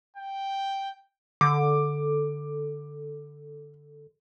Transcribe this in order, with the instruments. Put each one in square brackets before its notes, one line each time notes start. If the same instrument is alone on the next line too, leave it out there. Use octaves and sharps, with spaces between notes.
[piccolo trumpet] G5
[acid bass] D3 [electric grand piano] D6